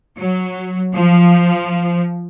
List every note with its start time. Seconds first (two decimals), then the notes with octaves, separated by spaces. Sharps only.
0.18 F#3
0.94 F3